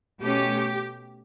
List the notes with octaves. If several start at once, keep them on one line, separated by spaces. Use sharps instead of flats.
B2 A3 C#4 G4